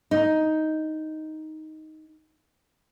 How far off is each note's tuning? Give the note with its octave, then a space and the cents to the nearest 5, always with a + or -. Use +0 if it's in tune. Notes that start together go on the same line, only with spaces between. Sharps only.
D#4 +5